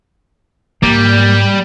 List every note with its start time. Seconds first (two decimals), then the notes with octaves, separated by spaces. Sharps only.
0.83 G#2 G3 A#3 D5